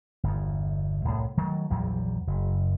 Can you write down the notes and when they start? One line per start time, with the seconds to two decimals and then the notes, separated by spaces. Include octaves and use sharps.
0.23 G1 E2
1.05 C2 A2
1.37 D#3 F#3 A3
1.70 A#1 E2 F#3 G3
2.27 F#1